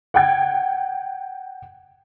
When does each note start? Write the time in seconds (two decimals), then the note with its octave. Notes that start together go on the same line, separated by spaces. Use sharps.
0.14 F#5 G5 G#6